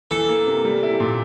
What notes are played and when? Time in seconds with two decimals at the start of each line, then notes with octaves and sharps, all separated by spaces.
0.11 E3 A4
0.28 A#3
0.47 C3
0.65 G3
0.83 E4
1.00 A#2